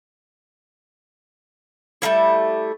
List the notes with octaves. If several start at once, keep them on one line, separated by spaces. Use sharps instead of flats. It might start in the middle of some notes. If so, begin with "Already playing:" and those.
G3 A3 A#3 E4